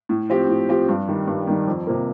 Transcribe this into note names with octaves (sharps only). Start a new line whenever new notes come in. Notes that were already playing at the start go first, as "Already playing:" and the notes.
A2
F3 C4 G4
A2
F3 C4 G4
G2
D#3 G3
G2
D#3 G3
F2
C3 F3 A#3